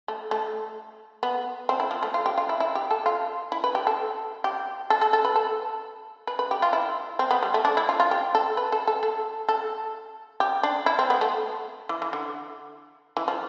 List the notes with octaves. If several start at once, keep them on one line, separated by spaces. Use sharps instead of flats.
A3
A3
B3
C4
E4
F3
A3
F4
G4
F4
E4
E4
G4
A4
F4
E4
B4
G4
A4
G4
A4
A4
A4
B4
A4
B4
B4
G4
F4
E4
C4
B3
G3
A3
D4
E4
F4
F4
G4
A4
B4
A4
A4
A4
A4
G4
D4
E4
C4
B3
A3
E3
E3
D3
E3
F3